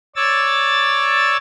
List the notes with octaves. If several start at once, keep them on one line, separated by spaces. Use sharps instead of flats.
C#5 D5 E6 A6